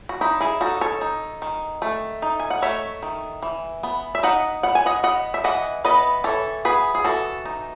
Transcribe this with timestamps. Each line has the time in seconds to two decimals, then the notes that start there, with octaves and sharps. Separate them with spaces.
0.09 F#4
0.21 D#4 E4
0.40 E4 G#4
0.61 D#4 F#4 A4
0.81 A4 C#5
1.01 D#4
1.42 D#3
1.82 A3
2.22 D#4
2.40 G#5
2.50 F#5
2.62 A3 C#5 E5
3.03 D#3
3.43 E3
3.83 B3
4.15 E5
4.23 D#4 D#5 F#5
4.63 B3 F#5
4.75 G#5
4.86 D#5 F#5
5.03 B3 D#5 F#5
5.34 E5
5.44 E3 D#5 F#5
5.85 B3 B4 D#5
6.24 E3 A4 C#5
6.65 B3 G#4 B4
6.95 G#4
7.04 E3 F#4 A4
7.45 D#4